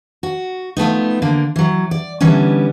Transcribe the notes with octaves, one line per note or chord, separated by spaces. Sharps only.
F#4
F3 A3 B3 D#4
D3 A#3
E3 F#3
D5
D3 E3 G3 B3 C#4